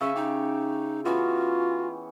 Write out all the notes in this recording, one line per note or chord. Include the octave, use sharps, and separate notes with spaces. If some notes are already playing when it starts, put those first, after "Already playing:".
C#3 C#4 E5 C#6
D#4 G4
E3 B3 C#4 F4 F#4